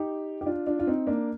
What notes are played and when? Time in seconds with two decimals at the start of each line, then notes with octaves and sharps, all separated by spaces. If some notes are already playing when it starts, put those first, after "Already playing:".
Already playing: D#4 G4
0.41 G4
0.46 D4 F4
0.67 D4 F4
0.79 F4
0.87 C4 D#4
1.07 A#3 D4